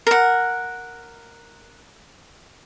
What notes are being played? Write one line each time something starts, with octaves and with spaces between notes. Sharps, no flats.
A#4 F#5